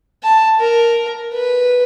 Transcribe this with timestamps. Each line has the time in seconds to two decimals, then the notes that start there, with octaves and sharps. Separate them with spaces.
0.24 A5
0.60 A#4
1.33 B4